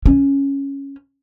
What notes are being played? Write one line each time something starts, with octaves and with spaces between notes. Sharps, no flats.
C#4